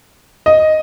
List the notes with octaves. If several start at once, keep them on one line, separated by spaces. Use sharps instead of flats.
D#5